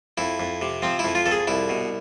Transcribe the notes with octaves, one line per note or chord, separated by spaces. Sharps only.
F2 E4
F2
C3
F3 C4
E4
F2
F4
F2 A4
G#4
C2 E4
B2